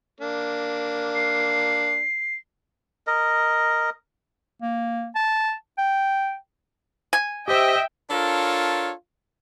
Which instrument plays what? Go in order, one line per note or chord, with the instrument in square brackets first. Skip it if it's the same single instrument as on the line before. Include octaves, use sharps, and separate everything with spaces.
[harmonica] A#3 D4
[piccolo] C7
[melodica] A#4 D#5
[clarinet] A#3
A5
G5
[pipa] G#5
[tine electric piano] G4 C5 [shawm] D#5 [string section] E5 G5
[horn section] D4 F4 A4 A#4 C#5